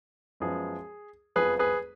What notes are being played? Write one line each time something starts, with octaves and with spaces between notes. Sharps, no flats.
F#2 F3 G#3 B3 G#4
F#1 F2 F3 B3 G#4 B4
G#4 B4